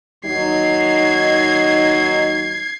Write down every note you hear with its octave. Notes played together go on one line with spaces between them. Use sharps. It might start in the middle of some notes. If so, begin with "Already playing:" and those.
D#2 F#3 D#4 G#6 C7